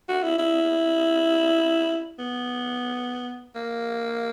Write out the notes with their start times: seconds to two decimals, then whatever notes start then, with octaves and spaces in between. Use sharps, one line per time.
0.09 F#4
0.23 E4
0.39 E4
2.19 B3
3.56 A#3